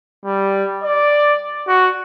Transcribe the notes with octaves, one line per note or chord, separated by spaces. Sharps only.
G3
D5
F#4